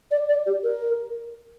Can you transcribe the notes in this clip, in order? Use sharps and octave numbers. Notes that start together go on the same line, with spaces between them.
D5
D5
G4
A#4